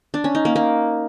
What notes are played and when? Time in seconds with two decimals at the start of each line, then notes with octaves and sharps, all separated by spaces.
0.14 D4
0.24 C#4
0.35 D#4
0.45 A#3
0.56 A#3